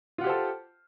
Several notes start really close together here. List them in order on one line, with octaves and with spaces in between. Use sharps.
F4 F#5 G4 C5 A4